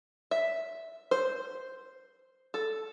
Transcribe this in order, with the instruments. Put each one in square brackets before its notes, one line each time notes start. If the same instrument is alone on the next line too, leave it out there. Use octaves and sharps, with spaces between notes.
[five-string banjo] E5
C5
A4